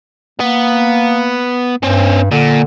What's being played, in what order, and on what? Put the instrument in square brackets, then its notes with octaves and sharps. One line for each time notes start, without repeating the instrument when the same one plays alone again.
[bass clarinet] A#3 [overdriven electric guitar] B3
[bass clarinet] G2 [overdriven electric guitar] C4 C#4
[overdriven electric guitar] A#2 [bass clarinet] D3